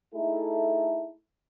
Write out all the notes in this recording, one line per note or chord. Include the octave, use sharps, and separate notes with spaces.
A3 D#4 E4 G#4 A4